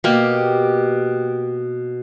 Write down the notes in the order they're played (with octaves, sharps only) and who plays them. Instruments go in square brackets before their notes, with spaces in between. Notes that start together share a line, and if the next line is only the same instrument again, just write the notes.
[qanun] B2 A#3 [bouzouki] G4